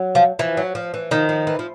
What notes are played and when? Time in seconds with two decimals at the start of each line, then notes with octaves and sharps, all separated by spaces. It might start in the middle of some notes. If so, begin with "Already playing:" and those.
Already playing: F#3
0.15 F3
0.39 E3 F3
0.57 F#3
0.75 F3
0.94 E3
1.11 D#3 F3
1.29 F3
1.47 E3
1.59 F3